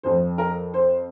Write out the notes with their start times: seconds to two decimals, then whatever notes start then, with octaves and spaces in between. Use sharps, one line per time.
0.03 F2 F3 C5
0.38 A#4
0.74 C5